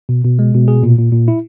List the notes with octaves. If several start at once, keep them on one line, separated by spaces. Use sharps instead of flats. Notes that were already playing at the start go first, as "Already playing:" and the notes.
B2
B2
G#3
B2
G#4
A#2
A#2
A#2
E4